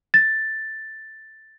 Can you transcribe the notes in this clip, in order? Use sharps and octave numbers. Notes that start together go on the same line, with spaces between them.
A6